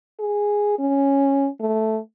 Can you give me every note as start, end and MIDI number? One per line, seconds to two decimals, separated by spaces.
0.20 0.77 68
0.79 1.48 61
1.60 1.99 57